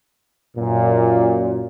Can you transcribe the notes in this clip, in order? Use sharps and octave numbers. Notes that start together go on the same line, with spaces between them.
F#2 A#2